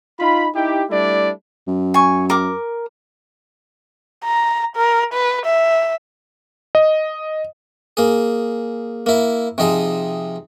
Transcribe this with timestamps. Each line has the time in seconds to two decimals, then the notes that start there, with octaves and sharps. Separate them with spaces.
0.19 D#4 F4 B5
0.55 D#4 E4 G4
0.90 G3 A3 D4 E4 D5
1.67 F#2
1.94 G#5 C#6
2.30 A#4 D6
4.24 A#5
4.76 A#4
5.13 B4
5.45 E5
6.75 D#5
7.97 A#3 G#4
9.06 A#3 E4
9.58 C3 F3 D#4 G#4